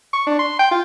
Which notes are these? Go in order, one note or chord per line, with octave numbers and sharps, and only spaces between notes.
C#6
D4
C6
G5
F4